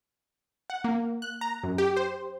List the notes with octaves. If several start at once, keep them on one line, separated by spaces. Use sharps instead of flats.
F#5
A#3
F#6
A#5
F#2
G4
C5